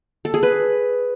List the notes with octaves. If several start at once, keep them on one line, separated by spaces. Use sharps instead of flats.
A4
G#4
B4